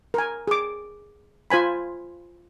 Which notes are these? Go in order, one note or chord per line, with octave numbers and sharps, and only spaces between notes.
A#4 G#5
G#4 D6
F4 C5 G#5 B5